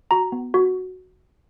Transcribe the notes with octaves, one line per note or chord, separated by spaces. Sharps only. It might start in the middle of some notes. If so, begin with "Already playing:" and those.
F#4 A#5
B3
F#4